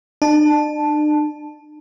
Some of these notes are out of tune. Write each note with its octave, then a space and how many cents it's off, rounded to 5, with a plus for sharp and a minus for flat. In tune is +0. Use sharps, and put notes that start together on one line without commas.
D4 +45 A5 -5